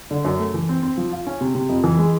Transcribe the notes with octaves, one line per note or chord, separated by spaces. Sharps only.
D3
F#2
A3
E3
C4
C4
F3
F4
C#4
C3
C3
F2
E3
G#3